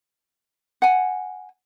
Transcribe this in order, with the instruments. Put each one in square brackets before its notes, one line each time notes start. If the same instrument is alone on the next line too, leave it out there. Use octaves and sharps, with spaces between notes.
[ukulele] F#5 G#5